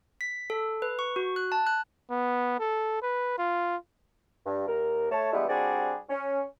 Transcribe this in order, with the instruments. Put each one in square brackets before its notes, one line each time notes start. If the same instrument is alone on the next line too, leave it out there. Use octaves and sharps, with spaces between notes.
[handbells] B6
A4
B4
C#6
F#4
F#6
A5
F#6
[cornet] B3
A4
B4
F4
[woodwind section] G2
D#2 A#4
A3 C#5 A5
E3 G3 G#3 B3 D4 E4
G3 C4 D4 F#4 G#4 D5
C#4